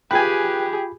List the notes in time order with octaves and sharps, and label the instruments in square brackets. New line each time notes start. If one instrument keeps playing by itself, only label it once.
[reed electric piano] F4 B5 [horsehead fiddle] G4 G#4 [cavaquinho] B4 G#5 [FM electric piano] G5